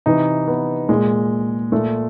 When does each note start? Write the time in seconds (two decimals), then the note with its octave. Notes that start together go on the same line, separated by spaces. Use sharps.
0.06 C3 E3 D#4
0.48 B3
0.89 A#2 G#3
1.72 A#2 A3